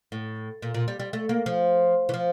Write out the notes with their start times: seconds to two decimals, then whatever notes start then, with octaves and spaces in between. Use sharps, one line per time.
0.12 A2
0.62 A#2
0.74 A#2
0.88 G3
0.99 G3
1.13 A3
1.29 A#3
1.46 F3
2.09 E3
2.14 F3